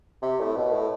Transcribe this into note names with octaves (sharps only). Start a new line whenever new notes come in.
C3
A2
B2
A2